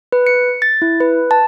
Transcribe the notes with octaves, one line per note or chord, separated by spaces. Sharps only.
B4
C#7
A6
E4
B4
A5